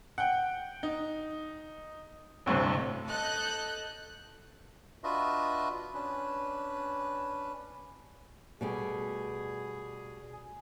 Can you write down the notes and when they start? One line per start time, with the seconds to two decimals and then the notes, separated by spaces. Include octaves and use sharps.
0.18 F#5 G5
0.83 D#4
2.46 A1 D2 G2 C3
3.07 A4 D#5 F#6 G6
5.04 D4 F4 F#4 B4 D#5 E5
5.94 C#4 D4 B4
8.61 B2 G3 A3 G#4